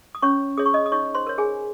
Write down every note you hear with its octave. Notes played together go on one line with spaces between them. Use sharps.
D#6
C#4 C#5 C#6
G#4 C#5 D#6
C#6
D#5 D#6
D#6
D#4 C#5 C#6
C5 C6
A#4 C#5
G#4 G#5